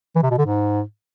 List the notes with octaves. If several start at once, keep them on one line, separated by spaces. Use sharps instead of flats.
E3
C3
B2
D3
G#2